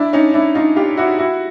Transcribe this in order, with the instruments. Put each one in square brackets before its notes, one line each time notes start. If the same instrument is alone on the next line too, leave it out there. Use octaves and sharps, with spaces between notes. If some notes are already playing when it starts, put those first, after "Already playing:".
Already playing: [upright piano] D4 E4
C#4 D#4
D4 E4
D#4 F4
F4 G4
E4 F#4
E4 F#4